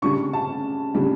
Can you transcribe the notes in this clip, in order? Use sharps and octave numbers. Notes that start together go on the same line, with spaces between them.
C#3 G3 D4 C#6
A5
C#3 G3 D4